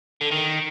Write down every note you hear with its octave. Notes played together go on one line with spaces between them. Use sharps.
D3
D#3